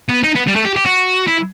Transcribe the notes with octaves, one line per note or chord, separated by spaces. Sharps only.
B3
D#4
B3
G3
A3
G4
G4
F#4
E4